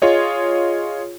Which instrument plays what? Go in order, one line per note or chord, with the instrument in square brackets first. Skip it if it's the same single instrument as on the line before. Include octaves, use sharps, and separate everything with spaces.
[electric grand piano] F4 G#4 C#5 D#5